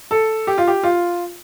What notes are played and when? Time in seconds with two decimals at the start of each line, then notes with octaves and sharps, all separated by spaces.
0.11 A4
0.47 G4
0.58 F4
0.67 G4
0.83 F4